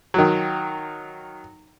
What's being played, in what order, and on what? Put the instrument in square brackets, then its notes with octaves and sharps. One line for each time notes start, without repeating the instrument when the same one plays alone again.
[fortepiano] D#3 F#3